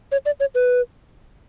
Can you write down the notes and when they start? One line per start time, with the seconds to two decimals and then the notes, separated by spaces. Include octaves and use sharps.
0.12 C#5
0.26 D5
0.40 C#5
0.55 B4